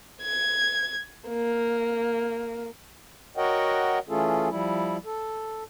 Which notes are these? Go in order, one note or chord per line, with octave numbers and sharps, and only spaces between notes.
G#6
A#3
F#4 A#4 C#5 D#5 F#5 G5
E3 A3 C#4 F4 G#4 A4
F3 G3 E4
A4